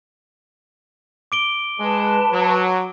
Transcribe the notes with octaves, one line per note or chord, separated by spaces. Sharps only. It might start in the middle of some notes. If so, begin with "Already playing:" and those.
D6 D7 G7
G#3 B4 A5
F#3